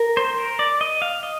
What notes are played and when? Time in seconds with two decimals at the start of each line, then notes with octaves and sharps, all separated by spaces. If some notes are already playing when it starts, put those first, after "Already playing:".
Already playing: A#4
0.17 C5
0.38 A#4
0.59 D5
0.81 D#5
1.02 F5
1.23 D#5